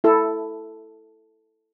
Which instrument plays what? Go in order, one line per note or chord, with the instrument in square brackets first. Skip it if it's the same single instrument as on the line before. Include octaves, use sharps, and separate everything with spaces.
[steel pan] E4 A4